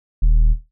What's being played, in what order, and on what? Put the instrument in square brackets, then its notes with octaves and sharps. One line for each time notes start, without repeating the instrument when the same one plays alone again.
[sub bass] D#1